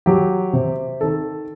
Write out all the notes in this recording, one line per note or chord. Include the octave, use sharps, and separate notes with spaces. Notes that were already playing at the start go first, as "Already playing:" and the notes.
F#3 G4
C3
D#3 A4